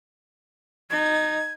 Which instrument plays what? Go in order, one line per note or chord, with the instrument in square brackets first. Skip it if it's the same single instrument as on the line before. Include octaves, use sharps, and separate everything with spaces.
[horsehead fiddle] D#4 [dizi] G#6